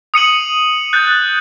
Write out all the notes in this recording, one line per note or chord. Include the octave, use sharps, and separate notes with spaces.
D#6 C#7 D#7 F#7
F#6 G6 A6